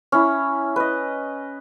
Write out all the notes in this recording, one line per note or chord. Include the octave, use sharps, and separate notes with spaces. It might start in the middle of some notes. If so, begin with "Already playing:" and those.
C#4 E4
B4 D#5